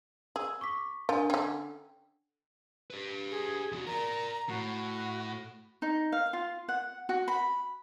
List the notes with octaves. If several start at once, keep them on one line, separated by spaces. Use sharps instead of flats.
G#4 E6
C#6 D6 B6
D4 F4 A#4 G#5
D3 C#4 G5
G4 B4
G#4
E2 F#4
A#4 D5 A#5
A2 F#4
D#4
F5
F4
F#5
F#4
B5